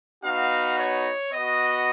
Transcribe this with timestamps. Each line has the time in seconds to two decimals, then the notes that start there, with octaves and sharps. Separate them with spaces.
0.24 B3 D#4 F#4 F5
0.78 C#5
1.33 B3 F#4 D#5